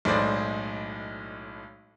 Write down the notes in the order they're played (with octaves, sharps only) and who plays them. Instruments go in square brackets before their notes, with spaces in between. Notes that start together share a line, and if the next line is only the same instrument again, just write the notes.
[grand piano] B1 A2 G#3 C5 D5